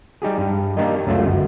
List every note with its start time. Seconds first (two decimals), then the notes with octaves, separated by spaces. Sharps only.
0.22 G3 D#4 G4 G#4
0.38 G2
0.77 A#3 D4 D#4 G4 A#4 D#5
1.06 C#2 F#2 A3 F4
1.25 G1 F#2